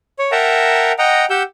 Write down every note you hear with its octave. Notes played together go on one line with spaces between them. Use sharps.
C#5
A#4 E5 F#5 G5 A5 A#5
D#5 F#5 G5 A#5
G4 F#5 E6 G6